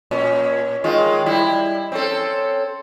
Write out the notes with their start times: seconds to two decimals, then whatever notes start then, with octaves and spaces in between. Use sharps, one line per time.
0.11 A#2 C#4
0.84 D#3 G#3 F4
1.26 G3 E4
1.92 C4 C#4 A4